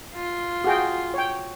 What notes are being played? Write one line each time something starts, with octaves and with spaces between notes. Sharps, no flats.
F4
F#4 G#4 G5
C#5 G5